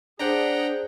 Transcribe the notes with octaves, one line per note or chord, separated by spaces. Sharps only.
D4 G#4 C5 D5 F#5 G5 A#5